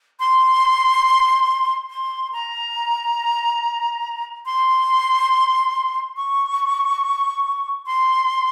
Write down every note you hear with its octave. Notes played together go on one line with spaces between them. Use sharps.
C6
C6
A#5
C6
C#6
C6